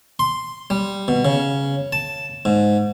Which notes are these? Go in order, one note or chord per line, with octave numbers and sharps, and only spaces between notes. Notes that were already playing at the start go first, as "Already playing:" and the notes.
C6
G3
B2
C#3
A5
G#2